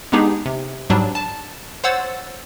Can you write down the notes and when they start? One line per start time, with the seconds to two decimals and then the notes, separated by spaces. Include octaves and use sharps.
0.12 G#3 B3 D4 D#4 G4 G#4
0.46 C3
0.90 G#2 F#3 G3 D4
1.15 A5
1.84 C5 C#5 F#5 E6 A6